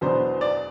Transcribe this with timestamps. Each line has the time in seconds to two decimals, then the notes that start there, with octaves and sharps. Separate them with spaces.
0.01 E2 B2 F#3 B3 D4 C5
0.41 D5